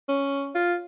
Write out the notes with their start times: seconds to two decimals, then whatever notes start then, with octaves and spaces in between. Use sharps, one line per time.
0.09 C#4
0.55 F4